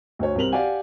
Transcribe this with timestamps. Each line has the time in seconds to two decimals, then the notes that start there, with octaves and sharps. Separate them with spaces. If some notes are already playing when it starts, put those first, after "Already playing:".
0.19 D2 C5 C#5
0.35 C2 C4 A#4 F7 F#7
0.52 G4 D5 F5 F#5 G#5